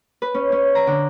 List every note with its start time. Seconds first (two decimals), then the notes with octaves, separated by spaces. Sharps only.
0.22 B4
0.34 C#4
0.52 C#4
0.75 A#5
0.87 D3